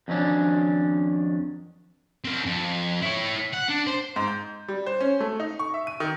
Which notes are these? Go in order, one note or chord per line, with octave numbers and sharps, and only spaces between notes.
F2 D#3 F#3 C#4 D4
C4 A#4
F2
E4 C#5
F#5
D4
C5
G#2
G6
G3
C5
C#4
A3
D#4
C#6
E5
D#7
D#3